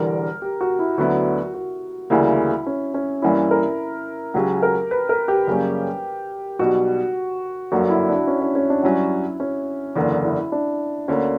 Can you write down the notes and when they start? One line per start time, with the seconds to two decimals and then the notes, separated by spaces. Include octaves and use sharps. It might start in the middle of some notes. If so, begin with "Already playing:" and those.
Already playing: E1 E2 D3 G3 A#4
0.42 G4
0.61 F#4
0.79 E4
0.98 D2 D3 F#3 B3 E4 F#4
1.54 F#4
2.10 D2 C#3 E3 G3 A#3 E4
2.66 C#4
2.94 C#4
3.22 G2 E3 A#3 C#4 E4
3.51 A#4
4.34 C#2 C#3 F#3 C#4 G4
4.63 A#4
4.91 B4
5.09 A#4
5.28 G4
5.47 F#2 C#3 G3 A#3 C#4
6.59 B1 B2 G3 F#4
7.72 G1 F#2 D3 A#3 F#4
7.90 E4
8.09 D4
8.27 C#4
8.41 C#4
8.55 C#4
8.70 D4
8.83 G2 F#3 C#4 E4
9.40 C#4
9.96 F#1 E2 D3 A#3
10.24 E4
10.52 D4
11.08 D2 D3 A#3 C#4